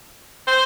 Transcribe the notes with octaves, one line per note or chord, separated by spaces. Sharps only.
C5